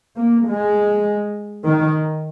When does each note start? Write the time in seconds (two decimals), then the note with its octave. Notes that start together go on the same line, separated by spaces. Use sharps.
0.16 A#3
0.46 G#3
1.65 D#3